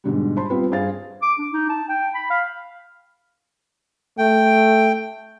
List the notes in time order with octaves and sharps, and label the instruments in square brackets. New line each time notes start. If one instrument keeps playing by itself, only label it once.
[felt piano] G#2 B2 D3 G3
C5 A5 B5 C6
G3 B3 C4 F4 B4
G2 G#4 C5 F5 A6
[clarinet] D6
D4
D#4
A5
G5
B5
F5
[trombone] A3 [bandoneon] G5